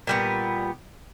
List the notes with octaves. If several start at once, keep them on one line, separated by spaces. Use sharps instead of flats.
A#2 G3 B3